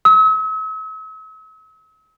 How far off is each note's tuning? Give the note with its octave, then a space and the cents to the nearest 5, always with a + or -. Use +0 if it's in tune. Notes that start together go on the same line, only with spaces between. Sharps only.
E6 -45